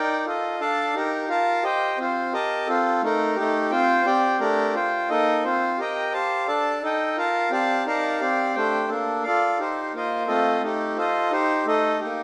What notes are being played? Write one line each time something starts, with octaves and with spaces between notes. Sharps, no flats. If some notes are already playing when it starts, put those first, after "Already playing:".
Already playing: D#4 A#4 D5 G5
F4 A4 D#5
D4 A4 D5 F5 A5
D#4 G4 A#4
F4 A#4 F5 A5
G4 C5 D#5 G5
C4 F4 C5
G4 A#4 D#5 A5
C4 F4 A4
A3 D#4 A#4
A3 D#4 G4
C4 F4 C5 G5
C4 G4 D5 G5
A3 D4 G4 A#4 D5
F4 C5 G5
A#3 D#4 A4 D#5
C4 F4 C5
G4 A#4 D#5 G5
G4 C5 F5 A5
D4 A4 D5 A5
D#4 A4 D#5 G5
F4 A#4 F5 A5
C4 G4 D5 F5 A5
D#4 A#4 D5 F5 A5
C4 G4 D5 F5
A3 D4 G4 C5 G5
A#3 D4 A4
F4 A4 D5 F5
D#4 G4 C5
A#3 F4 C5 D#5
A3 C4 F4 A4 D#5
A3 D#4 G4
F4 A4 C5 D#5
D#4 G4 C5
A3 D#4 A4 D#5
A#3 D#4 G4